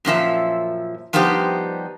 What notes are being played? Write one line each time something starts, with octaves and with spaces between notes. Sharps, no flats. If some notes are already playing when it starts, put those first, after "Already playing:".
F#2 A#2 F3 E5
F3 G3 B3 D#4 G4 C5